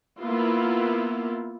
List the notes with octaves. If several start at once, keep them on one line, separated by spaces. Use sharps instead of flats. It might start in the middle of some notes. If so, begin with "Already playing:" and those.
A#3 B3 E4 F4